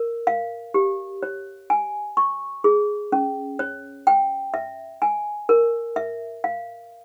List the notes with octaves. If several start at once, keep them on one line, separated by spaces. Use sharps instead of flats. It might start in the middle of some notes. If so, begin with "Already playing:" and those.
Already playing: A#4
F5
G4
C#5
G#5
C#6
G#4
C#4
C#5
G5
E5
G#5
A#4
E5
F5